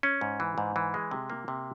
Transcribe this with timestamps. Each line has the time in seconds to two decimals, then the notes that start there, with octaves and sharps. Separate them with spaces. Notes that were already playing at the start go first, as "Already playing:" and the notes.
0.03 C#4
0.21 G#2
0.40 E3
0.58 G#2
0.76 E3
0.94 G#3
1.11 C3
1.30 A#3
1.48 C3